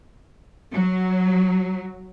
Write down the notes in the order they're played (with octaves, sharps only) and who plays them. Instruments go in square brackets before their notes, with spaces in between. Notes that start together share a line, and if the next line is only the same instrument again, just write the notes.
[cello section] F#3